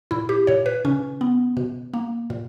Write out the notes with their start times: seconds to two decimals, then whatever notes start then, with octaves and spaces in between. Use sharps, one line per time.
0.11 A#2 E4
0.29 G4
0.47 A#2 C#5
0.66 B4
0.85 C#3 C#4
1.21 B3
1.57 B2
1.94 A#3
2.30 A#2